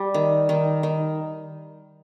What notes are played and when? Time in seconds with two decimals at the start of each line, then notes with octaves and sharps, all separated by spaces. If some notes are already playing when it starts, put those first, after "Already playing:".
Already playing: G3
0.14 D#3
0.49 D#3
0.83 D#3